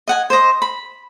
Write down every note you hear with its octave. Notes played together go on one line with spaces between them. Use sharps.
D#5 F#5 G#5
C5 D#5
B5